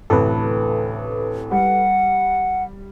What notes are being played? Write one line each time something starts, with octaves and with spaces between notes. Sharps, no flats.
A1 D2 C3 A4 B4
G3 F#5